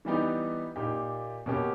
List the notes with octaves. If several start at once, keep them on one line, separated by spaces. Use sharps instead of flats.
E3 G3 B3 D#4 G4
A#2 A#3 D#4 G4
B2 A#3 C#4 G4